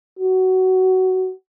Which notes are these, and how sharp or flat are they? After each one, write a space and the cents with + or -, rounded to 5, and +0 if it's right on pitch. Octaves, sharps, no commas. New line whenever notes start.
F#4 +15